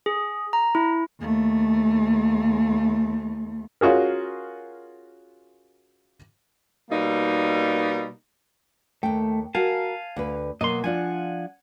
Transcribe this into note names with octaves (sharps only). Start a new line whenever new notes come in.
G#4
A#5
E4
D#2 A3
C#4 F4 F#4 G#4 A#4
B2 G3 A#3 D#4
D#2 A3 G5
F#4 A#4 F5 G#5 A5
D2 B4
B2 F#3 A#3 D#5 C6
F3 D4 F4 F#5 G#5